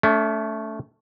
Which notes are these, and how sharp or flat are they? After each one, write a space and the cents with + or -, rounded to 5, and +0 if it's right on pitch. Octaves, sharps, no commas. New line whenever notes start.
A3 +0 C#4 +45